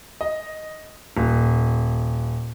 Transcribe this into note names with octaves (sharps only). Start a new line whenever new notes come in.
D#5
D#1